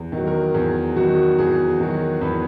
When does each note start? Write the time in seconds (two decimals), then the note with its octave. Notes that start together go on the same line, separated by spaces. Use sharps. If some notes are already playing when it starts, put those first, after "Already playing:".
Already playing: E2
0.12 D#3
0.17 F#3
0.27 A#4
0.54 E2 G#4
0.96 D#3 F#3 F#4
1.38 E2 G#4
1.79 D#3 F#3
2.21 E2 B4